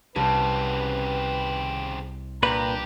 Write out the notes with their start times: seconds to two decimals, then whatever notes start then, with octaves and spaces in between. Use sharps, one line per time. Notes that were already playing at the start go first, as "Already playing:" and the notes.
0.16 C2 C#3 C4 B4 A5 G#6
2.43 G2 A#2 G4 B4 A#5 B5